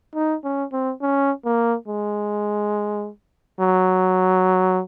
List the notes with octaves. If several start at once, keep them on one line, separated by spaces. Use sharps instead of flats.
D#4
C#4
C4
C#4
A#3
G#3
F#3